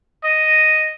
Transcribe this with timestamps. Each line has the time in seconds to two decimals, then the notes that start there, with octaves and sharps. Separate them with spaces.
0.24 D#5